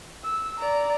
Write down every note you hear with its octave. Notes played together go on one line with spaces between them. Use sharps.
E6
D5 A#5